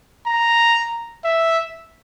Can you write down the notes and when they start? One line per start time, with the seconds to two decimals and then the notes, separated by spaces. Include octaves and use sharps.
0.26 A#5
1.24 E5